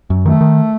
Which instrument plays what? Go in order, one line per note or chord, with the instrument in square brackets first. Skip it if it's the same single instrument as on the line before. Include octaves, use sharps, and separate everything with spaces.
[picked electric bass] F#2
[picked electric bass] D#3 [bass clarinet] A3
[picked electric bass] D#3